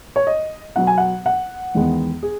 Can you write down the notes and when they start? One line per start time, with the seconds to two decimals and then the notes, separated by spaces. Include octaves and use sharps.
0.16 C#5
0.27 D#5
0.76 B2 F#3 B3 F#5
0.87 G#5
0.98 F#5
1.26 F#5
1.75 E2 D#3 G#3 B3
2.23 G#4